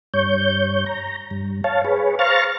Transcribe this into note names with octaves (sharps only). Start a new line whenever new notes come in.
G2 C#5 G6
A#5
G2
C#5 F5 A5
G#4 B4 C#5
C5 F5 A#5 C#6 F6 A6